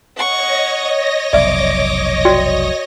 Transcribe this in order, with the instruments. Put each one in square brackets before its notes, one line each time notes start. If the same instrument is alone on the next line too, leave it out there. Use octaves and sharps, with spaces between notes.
[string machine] C#5 D#5 A#6 [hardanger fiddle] F#5 C#6
[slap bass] F1 B1 B2 [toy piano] D5 E5 [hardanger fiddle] D6
[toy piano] F#4 D5 G5